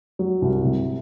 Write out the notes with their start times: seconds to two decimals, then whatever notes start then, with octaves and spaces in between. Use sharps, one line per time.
0.19 F#3
0.42 C2
0.64 C3